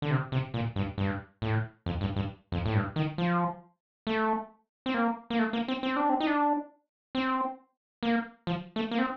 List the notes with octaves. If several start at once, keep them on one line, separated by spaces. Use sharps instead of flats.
D3
C3
C3
A#2
G2
G2
A2
F2
G2
G2
F2
A2
G2
D#3
F3
A3
C4
A#3
A#3
A3
A#3
C4
C4
D4
C4
D#4
D4
C4
A#3
F3
A3
A#3
C4